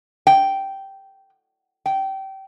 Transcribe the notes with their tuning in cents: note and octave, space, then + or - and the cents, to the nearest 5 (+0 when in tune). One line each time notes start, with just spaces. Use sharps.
G5 -10
G5 -25